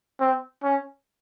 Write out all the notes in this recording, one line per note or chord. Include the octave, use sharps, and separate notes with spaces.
C4
C#4